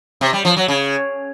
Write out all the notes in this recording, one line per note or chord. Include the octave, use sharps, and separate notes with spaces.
C3
G3
F3
F#3
C#3